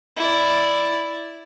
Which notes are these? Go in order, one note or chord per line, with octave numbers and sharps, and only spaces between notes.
E4 D5